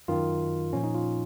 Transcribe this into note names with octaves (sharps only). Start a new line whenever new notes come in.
F#2 D#3 F4
A#2 F3 C#4
D#4
F4